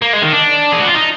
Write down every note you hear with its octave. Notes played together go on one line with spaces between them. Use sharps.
A#3
G#3
D#3
D4
G#4
F#4
F4
D#4